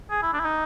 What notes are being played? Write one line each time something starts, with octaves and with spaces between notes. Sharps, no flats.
G#4
E4
D4
E4
D#4